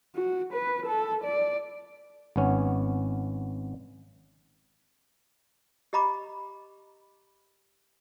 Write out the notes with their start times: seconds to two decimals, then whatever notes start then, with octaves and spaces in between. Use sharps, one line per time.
0.15 F#4
0.53 B4
0.86 A4
1.24 D5
2.36 G#1 B3 C#4
5.93 G4 D#5 A#5 B5 D6